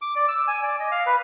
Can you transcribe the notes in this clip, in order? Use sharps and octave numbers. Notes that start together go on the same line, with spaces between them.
D6
D5
E6
G#5
D5
D#5
F5
B4